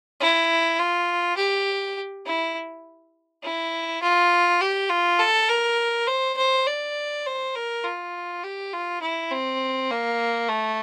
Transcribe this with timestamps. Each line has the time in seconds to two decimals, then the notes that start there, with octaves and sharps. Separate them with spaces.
0.20 E4
0.79 F4
1.37 G4
2.25 E4
3.43 E4
4.02 F4
4.61 G4
4.90 F4
5.19 A4
5.48 A#4
6.07 C5
6.37 C5
6.67 D5
7.26 C5
7.55 A#4
7.84 F4
8.43 G4
8.73 F4
9.01 E4
9.31 C4
9.90 A#3
10.48 A3